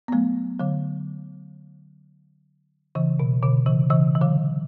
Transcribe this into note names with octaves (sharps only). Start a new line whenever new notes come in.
B3
F#3 A3
D3 F#3
C#3 E3
B2
B2 D3
C#3 E3
C#3 E3
E3
D3 F#3